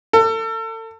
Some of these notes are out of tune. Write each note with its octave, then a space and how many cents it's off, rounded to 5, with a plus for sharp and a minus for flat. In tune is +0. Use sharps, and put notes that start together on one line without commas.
A4 +35